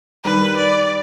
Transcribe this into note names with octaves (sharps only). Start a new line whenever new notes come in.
D#3 G3 B4
D5